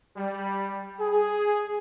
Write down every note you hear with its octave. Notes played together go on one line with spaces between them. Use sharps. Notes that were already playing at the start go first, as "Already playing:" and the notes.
G3
G#4